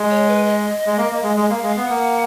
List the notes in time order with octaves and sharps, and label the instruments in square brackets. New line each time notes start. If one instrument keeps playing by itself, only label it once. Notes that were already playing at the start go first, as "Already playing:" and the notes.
Already playing: [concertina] G#3
[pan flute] C#5
B4
D#5
[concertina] G#3
A#3
A#3
G#3
G#3
[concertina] A#3 [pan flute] F5
[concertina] G#3 [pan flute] F5
[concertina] B3
[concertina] A#3 [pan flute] F#5